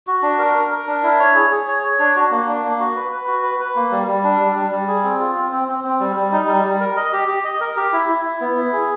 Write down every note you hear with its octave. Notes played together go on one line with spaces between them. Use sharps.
F#4
D4
A#4
A#4
A#4
D4
E4
C#5
G#4
G#4
C#5
C#5
D4
F#4
A#3
D4
A#3
F#4
B4
B4
F#4
B4
B4
A#3
G3
G3
D4
G3
G3
G3
G#4
C4
F4
C4
C4
C4
C4
G3
G3
D#4
G3
G3
A#4
D#5
G4
G4
D#5
A#4
G4
E4
E4
E4
B3
E4
G#4